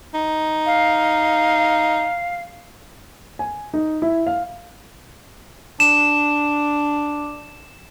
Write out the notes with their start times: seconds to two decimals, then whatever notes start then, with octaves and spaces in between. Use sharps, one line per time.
0.14 D#4
0.66 F5
3.39 G#5
3.74 D#4
4.02 E4
4.27 F5
5.80 D4 E7